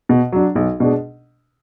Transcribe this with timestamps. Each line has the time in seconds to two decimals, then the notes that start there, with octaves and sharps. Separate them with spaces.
0.09 B2
0.32 F#3 D4
0.55 B1
0.80 B2 G#3 D4